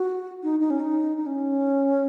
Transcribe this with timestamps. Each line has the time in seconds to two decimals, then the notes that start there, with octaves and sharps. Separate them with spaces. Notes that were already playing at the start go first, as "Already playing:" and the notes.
Already playing: F#4
0.43 D#4
0.60 D#4
0.70 C#4
0.80 D#4
1.17 D#4
1.26 C#4